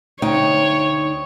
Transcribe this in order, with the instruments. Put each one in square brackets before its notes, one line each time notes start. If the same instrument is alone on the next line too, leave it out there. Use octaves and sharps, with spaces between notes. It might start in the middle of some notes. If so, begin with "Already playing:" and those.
[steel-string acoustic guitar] D2 D#4 G5 [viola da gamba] C#5